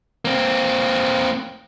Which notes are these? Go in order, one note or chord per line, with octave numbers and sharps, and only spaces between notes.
A#3 C4